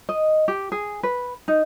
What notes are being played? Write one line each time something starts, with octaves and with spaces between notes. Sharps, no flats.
D#5
G4
G#4
B4
D#4